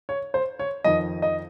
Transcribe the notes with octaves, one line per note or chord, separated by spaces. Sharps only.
C#5
C5
C#5
F2 D#3 D#5
D#5